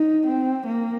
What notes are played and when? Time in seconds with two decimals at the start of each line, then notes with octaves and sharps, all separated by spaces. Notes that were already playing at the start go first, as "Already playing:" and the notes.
Already playing: D#4
0.26 C4
0.66 A#3